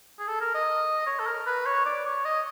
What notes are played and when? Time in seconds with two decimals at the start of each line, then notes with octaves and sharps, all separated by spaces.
0.19 G#4
0.27 A4
0.41 A#4
0.55 D#5
1.06 C#5
1.19 A4
1.27 A#4
1.46 B4
1.66 C#5
1.86 D5
2.06 C#5
2.25 D#5